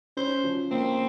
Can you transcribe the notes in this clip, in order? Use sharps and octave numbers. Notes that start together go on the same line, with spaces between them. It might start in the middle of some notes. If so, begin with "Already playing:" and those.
C#4 C5
F3
A#3 C4